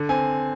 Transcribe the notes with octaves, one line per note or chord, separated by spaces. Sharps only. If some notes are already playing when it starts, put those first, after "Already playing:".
Already playing: D3
C4 G#5